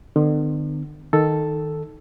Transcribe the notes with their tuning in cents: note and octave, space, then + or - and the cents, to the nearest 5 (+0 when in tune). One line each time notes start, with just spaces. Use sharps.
D3 +45 B3 +40
D#3 +0 A4 +0